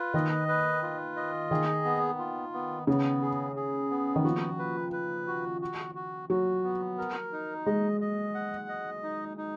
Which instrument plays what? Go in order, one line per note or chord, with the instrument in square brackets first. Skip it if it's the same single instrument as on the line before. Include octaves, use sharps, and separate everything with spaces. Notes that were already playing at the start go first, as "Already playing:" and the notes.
Already playing: [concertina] F4 B4
[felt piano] D#3 [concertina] D#5
[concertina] B4
F4
D#5
[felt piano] D#3 [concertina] G#4
[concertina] B3
F4
B3
[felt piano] C#3 [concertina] B3
[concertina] G#4
G#4
B3
[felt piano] D#3
[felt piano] F3 [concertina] F#4
[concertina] B4
B4
F#4
F#4
F#4
[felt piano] F#3 [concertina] F#4
[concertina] B3
A#4
D#4
[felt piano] G#3 [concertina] D#5
[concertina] D#5
F#5
D#5
D#4
D#4